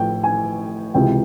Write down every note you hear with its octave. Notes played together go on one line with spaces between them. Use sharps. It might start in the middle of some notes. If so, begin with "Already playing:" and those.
Already playing: A1 A2 F3 G5
G#5
C#2 C3 E3 G5